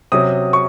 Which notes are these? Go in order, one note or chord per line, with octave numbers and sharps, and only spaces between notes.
C3 F#3 C#4 D#6
C#6